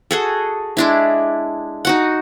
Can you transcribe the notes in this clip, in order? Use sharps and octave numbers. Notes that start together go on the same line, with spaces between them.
F#4 G#4 A4
G#3 D4 E4
D#4 F#4 F#5